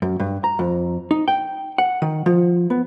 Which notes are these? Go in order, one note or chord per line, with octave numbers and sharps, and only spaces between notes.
F#2
G2
A#5
F2
D#4
G5
F#5
D#3
F3
B3